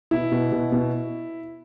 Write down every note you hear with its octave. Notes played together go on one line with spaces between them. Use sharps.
B2 E4
B2
B2
B2